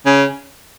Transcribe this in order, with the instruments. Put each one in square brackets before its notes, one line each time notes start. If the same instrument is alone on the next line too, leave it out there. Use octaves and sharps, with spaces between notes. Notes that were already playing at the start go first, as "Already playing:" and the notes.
[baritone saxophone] C#3